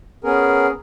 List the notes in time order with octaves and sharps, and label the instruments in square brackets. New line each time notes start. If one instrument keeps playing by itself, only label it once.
[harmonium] B3 C#4 G#4 A#4